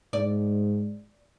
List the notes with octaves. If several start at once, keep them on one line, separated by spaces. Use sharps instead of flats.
G#2 D5